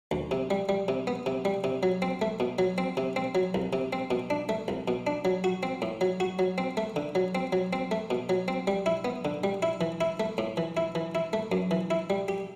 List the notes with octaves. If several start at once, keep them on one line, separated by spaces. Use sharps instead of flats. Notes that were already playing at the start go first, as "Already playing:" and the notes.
D2
C3
G3
G3
C3
B3
C3
G3
C3
F#3
C4
A3
B2
F#3
C4
C3
C4
F#3
C2
C3
C4
B2
D4
A3
C2
B2
D4
F#3
F#4
C4
A2
F#3
F#4
F#3
C4
A3
D3
F#3
C4
F#3
C4
A3
B2
F#3
C4
G3
E4
B3
D3
G3
E4
E3
E4
A3
A2
E3
E4
E3
E4
A3
F#2
E3
E4
G3
G4